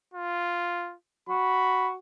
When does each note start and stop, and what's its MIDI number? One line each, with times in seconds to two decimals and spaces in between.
0.14 0.95 65
1.29 1.96 66
1.29 1.90 83